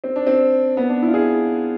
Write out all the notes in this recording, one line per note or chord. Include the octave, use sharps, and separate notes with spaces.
C4
D4
C4
B3
D4
E4
F4
G#4